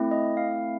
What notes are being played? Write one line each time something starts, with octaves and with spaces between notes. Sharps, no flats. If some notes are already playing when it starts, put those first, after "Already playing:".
Already playing: A3 C4 E4
D#5
F5